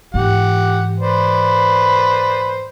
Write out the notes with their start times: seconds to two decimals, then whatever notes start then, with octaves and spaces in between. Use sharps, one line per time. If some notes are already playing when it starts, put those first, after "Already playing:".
0.14 G#2 E3 G4 F#5
1.00 B4 C5 D5